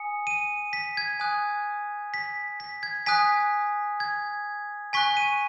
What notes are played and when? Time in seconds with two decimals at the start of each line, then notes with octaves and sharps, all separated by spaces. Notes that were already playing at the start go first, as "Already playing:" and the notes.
Already playing: G#5 D#6 C#7
0.27 D#7
0.73 B6
0.97 G#6
1.20 G#5 D#6 F#6
2.14 B6
2.60 B6
2.83 G#6
3.06 G#5 D#6 F#6 B6
4.00 G#6
4.93 G#5 C#6 F#6 B6
5.17 D#7